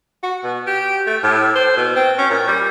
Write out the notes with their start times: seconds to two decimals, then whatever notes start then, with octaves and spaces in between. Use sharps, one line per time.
0.23 F#4
0.44 B2
0.67 G4
1.07 A3
1.23 A2
1.55 C5
1.77 B2
1.96 C4
2.18 C#4
2.30 A#2
2.48 G3